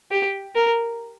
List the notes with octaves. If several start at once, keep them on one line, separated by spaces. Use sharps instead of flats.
G4
A#4